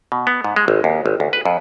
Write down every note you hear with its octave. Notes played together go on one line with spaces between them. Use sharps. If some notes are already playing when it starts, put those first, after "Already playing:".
B2
B3
G#2
G#3
G#1
D#2
G#1
D2
B4
F2